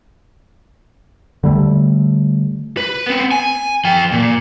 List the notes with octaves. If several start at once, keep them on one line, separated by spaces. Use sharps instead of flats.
D3 G3 A3
B4
B3 C4
G#5
F3 G5
A#2